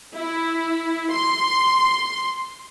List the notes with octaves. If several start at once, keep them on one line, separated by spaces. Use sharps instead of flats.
E4
C6